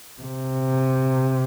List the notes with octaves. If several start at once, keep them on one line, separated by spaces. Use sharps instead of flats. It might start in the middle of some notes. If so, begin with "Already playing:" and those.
C3